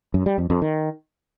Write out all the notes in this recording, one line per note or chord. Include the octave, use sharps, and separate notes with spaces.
F#2
G3
F2
F2
D#3